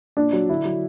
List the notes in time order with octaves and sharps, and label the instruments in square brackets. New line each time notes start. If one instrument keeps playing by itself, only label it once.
[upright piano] A#2 D4
F#3
D3 E4
F#3